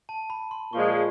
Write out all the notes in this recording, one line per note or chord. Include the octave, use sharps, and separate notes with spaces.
A5
B5
C6
A#2 F3 G#3 C#6